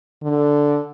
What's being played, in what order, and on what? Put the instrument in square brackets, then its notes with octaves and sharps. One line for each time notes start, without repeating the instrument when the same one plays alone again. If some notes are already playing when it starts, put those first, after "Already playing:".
[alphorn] D3